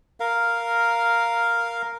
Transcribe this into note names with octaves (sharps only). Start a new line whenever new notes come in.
A#4 F5